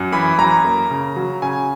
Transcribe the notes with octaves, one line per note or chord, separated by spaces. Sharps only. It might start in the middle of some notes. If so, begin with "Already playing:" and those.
Already playing: F#2
E3 B5
F#2 A#5
A#3
C#3
F#3
C#3 G#5